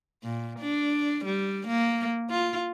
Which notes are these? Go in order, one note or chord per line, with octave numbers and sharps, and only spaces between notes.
A#2
D4
G3
A#3
F4